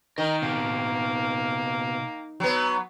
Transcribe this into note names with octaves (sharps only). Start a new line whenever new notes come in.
D#3 A#4 D#5
B2 A#3 C4
F#3 B3